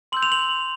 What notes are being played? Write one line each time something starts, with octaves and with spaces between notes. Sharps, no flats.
C6 E6 G6 F#7
F7
F#7